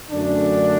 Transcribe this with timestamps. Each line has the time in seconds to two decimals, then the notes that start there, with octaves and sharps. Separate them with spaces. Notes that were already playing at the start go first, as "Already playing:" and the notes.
0.10 F#2 D3 A3 D4